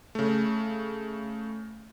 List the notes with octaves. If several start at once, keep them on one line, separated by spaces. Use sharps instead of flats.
C#3 A3